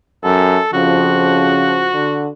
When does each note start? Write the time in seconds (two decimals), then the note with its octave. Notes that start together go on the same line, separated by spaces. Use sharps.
0.24 F#2 A4
0.73 F2 C#3 F3 F#4
1.94 D3